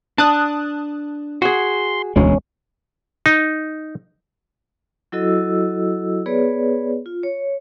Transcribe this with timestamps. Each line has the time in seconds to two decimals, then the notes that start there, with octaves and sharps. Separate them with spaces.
0.18 D4 A5 D#6 F#6
1.42 F#4 G#4 C6
2.16 E1 D2 G#3 C#4
3.26 D#4
5.12 F#3 E4 F#4 A4 D#5 E6
6.26 B3 G#4 B4 C#5 D5
7.06 F4
7.23 C#5